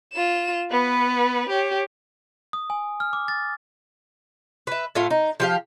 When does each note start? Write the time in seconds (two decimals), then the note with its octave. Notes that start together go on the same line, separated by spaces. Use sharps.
0.13 F4 E7
0.71 B3 B4
1.49 G4 C#5
2.53 D#6
2.70 G#5
3.00 F6
3.13 D6
3.28 A6
4.67 B4 E5
4.95 A2 A3 F4 F5
5.10 D#4
5.40 F3 G4 F5